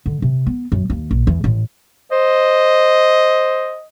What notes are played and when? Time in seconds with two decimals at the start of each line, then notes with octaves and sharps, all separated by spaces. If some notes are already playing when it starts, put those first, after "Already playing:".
0.06 D3
0.22 C3
0.47 B3
0.72 F#2
0.90 D#2
1.11 A#1
1.27 E2
1.44 A1
2.12 C5 D#5